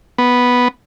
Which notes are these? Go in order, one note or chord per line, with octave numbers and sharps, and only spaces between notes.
B3